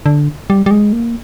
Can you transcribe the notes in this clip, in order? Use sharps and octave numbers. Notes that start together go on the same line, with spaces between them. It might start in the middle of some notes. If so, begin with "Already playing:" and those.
D3
G3
G3
G#3
A#3